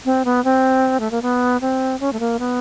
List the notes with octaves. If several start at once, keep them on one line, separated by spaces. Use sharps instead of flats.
C4
B3
C4
A3
A#3
B3
C4
C#4
A3
A#3
B3